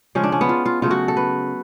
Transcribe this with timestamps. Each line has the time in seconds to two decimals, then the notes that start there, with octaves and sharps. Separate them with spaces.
0.15 C#3 F3 G#3 C#4
0.24 D4
0.32 C#4
0.41 B3
0.49 F4
0.66 F4
0.82 C#3 F#3 A3 F4
0.91 F#4
1.08 A4
1.17 B4